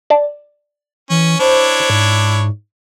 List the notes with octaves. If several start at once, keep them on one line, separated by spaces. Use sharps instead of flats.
D5 A5
E3 C#4
D4 E4 C5 C#5
G#2